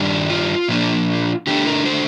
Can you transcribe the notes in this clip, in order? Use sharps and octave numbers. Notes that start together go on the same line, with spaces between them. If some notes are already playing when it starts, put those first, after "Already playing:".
Already playing: G2 D#3 G3 D4
F4
A#2 F3 A#3 D4
D3 A3 D4 G4
A#4
C5